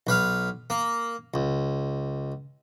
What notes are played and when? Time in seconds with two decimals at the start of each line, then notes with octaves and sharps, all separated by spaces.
0.07 B1 B4 F5
0.70 A#3
1.34 C#2